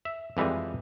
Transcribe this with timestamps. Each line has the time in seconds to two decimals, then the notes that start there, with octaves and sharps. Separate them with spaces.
0.05 E5
0.37 F2 E3 G3 G#3 G#5